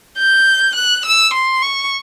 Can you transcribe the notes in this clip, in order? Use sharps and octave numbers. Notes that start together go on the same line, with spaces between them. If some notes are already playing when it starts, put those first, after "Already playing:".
G6
F#6
E6
C6
C#6